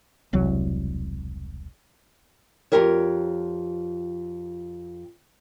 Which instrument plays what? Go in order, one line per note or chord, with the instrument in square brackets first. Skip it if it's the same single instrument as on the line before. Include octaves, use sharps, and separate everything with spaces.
[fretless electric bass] E1 C2 F#3
[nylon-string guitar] F2 C3 F4 G4 A#4 C#5